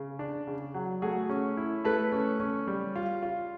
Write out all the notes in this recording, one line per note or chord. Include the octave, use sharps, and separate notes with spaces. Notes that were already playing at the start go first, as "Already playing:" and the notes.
Already playing: C#3
D4
C#3
F#3
A3 F#4 G#4
C#4
E4
A3 A4 B4
C#4
C#4
G3
F4
F4